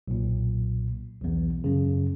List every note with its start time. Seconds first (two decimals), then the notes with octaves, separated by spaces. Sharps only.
0.08 B1 A#2
1.20 B1 E2
1.64 F#2 C#3